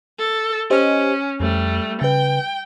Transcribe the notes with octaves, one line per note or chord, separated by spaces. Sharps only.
A4
C#4 G4 C5 D#5
F2 G3 A3
C#3 B4 G5